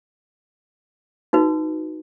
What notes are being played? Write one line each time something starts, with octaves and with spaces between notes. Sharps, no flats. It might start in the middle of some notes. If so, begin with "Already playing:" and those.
D#4 F#4 B4